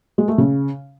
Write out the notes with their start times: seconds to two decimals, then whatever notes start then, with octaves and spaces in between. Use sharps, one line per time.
0.18 G#3
0.28 A3
0.38 C#3